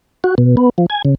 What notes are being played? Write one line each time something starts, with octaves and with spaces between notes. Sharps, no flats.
F#4
B2
B3
F3
G#5
C#3